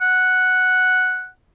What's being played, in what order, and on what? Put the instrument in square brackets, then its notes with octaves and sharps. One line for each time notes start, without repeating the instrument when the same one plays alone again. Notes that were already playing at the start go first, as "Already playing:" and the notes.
[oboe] F#5